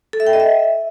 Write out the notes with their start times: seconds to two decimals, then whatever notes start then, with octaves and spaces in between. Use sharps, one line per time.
0.13 A4
0.20 E5
0.27 G5
0.33 D#5
0.40 E5